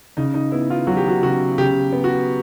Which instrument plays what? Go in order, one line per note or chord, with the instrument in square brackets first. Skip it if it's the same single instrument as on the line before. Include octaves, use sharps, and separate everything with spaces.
[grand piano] C#3 [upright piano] D#4
[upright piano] D#4
[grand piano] B3 [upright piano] E4
[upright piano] F4
[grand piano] F#3 [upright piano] F#4
[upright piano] G4
F#4
[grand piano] C#3 [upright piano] F#4
[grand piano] C#3 [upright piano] G4
[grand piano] B3
[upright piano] F#4